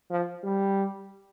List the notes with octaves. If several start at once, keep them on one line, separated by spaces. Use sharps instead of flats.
F3
G3